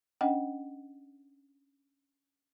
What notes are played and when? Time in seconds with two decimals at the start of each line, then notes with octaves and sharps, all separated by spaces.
0.21 C#4 D4 D#5 F#5 G5